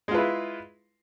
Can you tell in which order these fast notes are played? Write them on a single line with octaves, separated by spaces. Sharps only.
G#3 F4 B4 E4